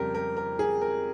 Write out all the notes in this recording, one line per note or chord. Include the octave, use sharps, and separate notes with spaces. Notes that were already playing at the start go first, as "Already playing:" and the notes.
Already playing: F2 C#3 G3 G4 A#4
A#4
A#4
G#4
A#4